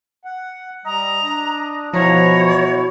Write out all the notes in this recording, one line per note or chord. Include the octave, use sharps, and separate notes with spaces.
F#5
G3 D#5 A#5
D4
B2 F3 E4 F#4 C#5 A#5